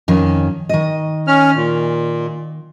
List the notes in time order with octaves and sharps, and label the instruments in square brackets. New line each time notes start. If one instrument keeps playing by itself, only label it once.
[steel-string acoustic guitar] F2 D#3 C#4
D#3 D#5
[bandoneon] C#4 F6
A#2